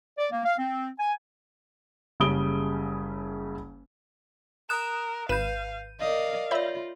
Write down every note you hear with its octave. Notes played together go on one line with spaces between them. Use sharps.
D5
A#3
F5
C4
G#5
F#1 C#3 G3 D#6 D7 G7
A#4 D#6 F#6 E7
G#1 B4 F5 G6 D#7 E7
A#4 D5 D#5 F5
F4 C#5 D5 E5 B5 G6